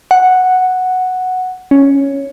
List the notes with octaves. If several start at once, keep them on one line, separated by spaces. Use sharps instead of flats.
F#5
C#4